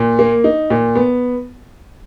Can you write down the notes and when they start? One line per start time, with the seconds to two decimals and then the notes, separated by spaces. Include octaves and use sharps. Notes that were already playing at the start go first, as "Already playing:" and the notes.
Already playing: A#2
0.19 A#3
0.44 D#4
0.70 A#2
0.95 B3